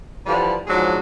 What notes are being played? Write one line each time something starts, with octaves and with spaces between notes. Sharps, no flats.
D3 E3 F3 G3
G#2 F3 F#3 D4 G#4